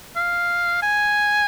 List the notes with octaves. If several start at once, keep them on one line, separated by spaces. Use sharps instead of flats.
F5
G#5